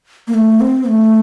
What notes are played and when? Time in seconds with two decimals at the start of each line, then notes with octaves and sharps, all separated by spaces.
0.28 A#3
0.34 A3
0.61 C4
0.88 A3